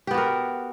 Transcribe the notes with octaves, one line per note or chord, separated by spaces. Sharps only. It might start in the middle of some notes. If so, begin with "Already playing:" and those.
B3 F#4 G4 A#4